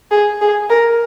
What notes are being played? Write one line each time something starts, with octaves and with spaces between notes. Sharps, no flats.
G#4
G#4
A#4